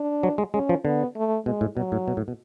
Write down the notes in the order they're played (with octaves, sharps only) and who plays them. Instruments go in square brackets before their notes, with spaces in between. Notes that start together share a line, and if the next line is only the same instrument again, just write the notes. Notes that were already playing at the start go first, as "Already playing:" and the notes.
Already playing: [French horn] D4
[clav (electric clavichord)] F#3
G#3
[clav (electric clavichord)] G#3 [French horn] C#4
[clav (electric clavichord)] F3
[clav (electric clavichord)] D3 [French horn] B3
[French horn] A3
[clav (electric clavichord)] B2 [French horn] G#3
[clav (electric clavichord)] A2
[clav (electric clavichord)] B2 [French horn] F#3
[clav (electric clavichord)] A2
B2
A2
B2